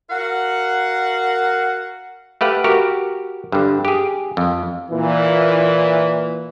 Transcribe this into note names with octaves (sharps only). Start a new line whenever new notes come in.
F#4 A#4 F5 F#5
A3 G4 B4 F5 F#5
F#4 G4 A#4
G2 D3
G4 G#4
F2
A#2 E3